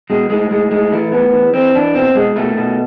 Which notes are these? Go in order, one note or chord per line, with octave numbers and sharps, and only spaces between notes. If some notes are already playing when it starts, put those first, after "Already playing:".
B2 G#3
A2 G#3
A2 G#3
A2 G#3
E3 A3
A2 B3
E3
E3 C4
E3 D4
B2 C4
B2 G#3
B2 A3
B2